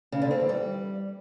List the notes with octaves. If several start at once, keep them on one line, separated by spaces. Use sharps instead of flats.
C#3
D3
C4
E3
G3